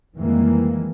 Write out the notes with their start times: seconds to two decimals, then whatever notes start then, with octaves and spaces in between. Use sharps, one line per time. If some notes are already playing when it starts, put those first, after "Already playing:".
0.17 F2 D#3 E3 G3 G#3 A#3